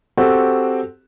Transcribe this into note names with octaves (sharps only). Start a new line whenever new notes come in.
C4 F#4 G4 A4